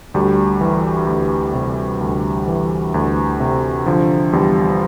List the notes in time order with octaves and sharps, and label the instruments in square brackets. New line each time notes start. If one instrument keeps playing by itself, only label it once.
[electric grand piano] D2 G3
E3
D2
C3
D2
E3
D2
C3
D3 F3
E2 G3